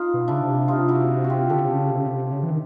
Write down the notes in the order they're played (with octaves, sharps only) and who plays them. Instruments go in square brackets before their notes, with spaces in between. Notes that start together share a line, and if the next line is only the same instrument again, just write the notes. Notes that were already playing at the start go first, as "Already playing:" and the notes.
Already playing: [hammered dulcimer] D#4 F4
[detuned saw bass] B2
[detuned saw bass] C#3 [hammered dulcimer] D4 E4
[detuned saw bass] C3
[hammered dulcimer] D#4 F4
E4 F#4
F#4
F4 G4
[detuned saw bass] D3 [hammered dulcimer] G4 A4
[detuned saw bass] C#3
C3
C#3
C3
C#3
C3
C#3
E3
D#3